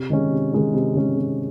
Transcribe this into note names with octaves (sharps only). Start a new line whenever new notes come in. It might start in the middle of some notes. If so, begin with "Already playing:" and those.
Already playing: C3
D#3 G#3 C#4
C3
D#3 G#3 C#4
C3
D#3 G#3 C#4
C3